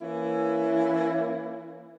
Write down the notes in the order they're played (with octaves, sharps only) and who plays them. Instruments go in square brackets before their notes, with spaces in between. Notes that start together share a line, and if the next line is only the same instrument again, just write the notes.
[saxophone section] E3 A#3 C#4 E4